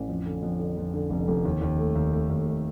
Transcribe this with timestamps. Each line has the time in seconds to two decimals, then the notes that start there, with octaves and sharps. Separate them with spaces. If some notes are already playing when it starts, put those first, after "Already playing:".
Already playing: A1
0.08 F2
0.26 D3
0.43 F2
0.59 D3
0.77 F2
0.94 D3
1.10 F1
1.28 F1
1.45 D#2
1.62 D#2
1.79 A3
1.95 D#2
2.13 A3
2.30 D#2
2.46 A3